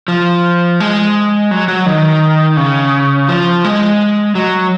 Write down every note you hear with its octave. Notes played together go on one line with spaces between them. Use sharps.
F3
G#3
F#3
F#3
D#3
C#3
F3
G#3
F#3